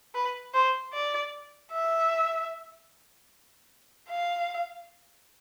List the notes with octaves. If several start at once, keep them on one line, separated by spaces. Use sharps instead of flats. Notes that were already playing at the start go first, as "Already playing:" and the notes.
B4
C5
D5
E5
F5